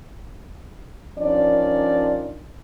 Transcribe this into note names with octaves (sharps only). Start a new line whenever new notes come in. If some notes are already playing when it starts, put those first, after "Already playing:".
D#3 F3 C#4 D4 D5